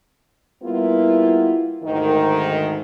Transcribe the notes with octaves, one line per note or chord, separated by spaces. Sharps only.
G3 A#3 B3 E4 F4
D2 G#2 D#3